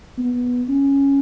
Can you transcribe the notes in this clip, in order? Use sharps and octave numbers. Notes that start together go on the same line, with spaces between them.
B3
C#4